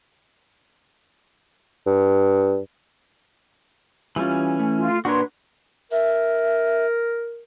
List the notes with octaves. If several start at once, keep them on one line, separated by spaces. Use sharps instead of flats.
G2
E3 G3 C#4 F4
A3
F4
A#2 D4 F#4 A#4 B4 C#5 C6
A#4 E5